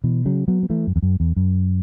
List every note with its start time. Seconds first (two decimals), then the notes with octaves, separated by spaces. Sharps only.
0.04 B2 E3
0.25 C#3 F#3
0.48 F#3 B3
0.63 B3
0.70 E3 A3
0.87 F#2
0.96 E2
1.03 F#2
1.20 E2
1.36 F#2